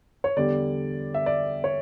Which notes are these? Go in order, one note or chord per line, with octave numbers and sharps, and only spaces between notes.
C#5
E2 D3 G3 D5
E5
D5
C#5